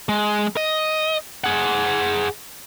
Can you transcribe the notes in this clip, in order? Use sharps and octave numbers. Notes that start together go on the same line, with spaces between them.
G#3
D#5
G#4 F#5